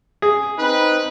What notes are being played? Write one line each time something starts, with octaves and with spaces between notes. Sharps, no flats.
G#4
C4 D#4 B4